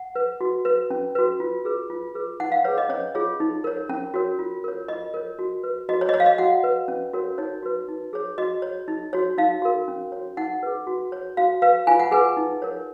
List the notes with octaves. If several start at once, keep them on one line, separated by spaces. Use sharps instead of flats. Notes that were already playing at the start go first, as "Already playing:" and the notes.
Already playing: F#5
B4
F#4
B4
C#4
F#4 B4
F4
G#4 B4
F4
G#4 B4
D#4 F#5
F5
G#4 B4 C#5
D#5
C#4 C#5
F4 G#4 C#5
D#4
A#4 C#5
C#4
F#4 A#4 C#5
F4
A#4 C#5
F4 D#5
A#4 C#5
F#4
B4
F#4 D#5
C#5
D#5
C#5
F5
D#5
F#4 F#5
B4
C#4
F#4 A#4 C#5
D#4 C#5
F#4 B4
D#4
G#4 C#5
F#4 D#5
C#5
D#4
F#4 C#5
D#4 F5
F#4 A#4
C#4
C#5
F#4
D#4 F#5
G#4 B4
F#4
C#5
F#4 F5
B4 F5
F4 G#5
F#5
G#4 B4 G#5
D#4
A#4 C#5